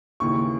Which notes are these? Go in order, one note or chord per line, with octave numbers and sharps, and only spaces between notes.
D#2 C#3 E3 C#6